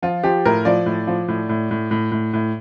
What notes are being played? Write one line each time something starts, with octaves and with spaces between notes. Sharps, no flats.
F3 F4
F3 G4
A2 A#4
F3 D5
A2
F3
A2
A2
A2
A2
A2
A2